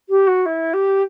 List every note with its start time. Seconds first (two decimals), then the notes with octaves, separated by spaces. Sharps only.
0.09 G4
0.27 F#4
0.46 E4
0.73 G4